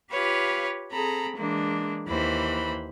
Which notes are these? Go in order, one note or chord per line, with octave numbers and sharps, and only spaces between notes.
F4 G4 B4 C#5 F5
C4 G#4 A4 A#5 B5
E3 G#3 A#3 D4
D#2 E3 C5 B5